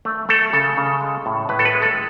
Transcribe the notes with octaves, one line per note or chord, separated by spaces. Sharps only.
A3
A3 A4
C#3 A4
C#3
G#3
A2
A2 B4
A4
B4
G#3
A4